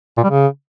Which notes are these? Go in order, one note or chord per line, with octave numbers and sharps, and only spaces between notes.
A#2
G3
C#3